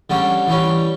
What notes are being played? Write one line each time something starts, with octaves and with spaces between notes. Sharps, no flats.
D3 G3 C#4
E3 G3 C#4